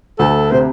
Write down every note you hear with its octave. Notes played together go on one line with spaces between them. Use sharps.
D2 A4
C3 C5